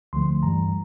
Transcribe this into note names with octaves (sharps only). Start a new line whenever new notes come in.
D2 D3 F3 A3 C6
G2 E3 G3 A#5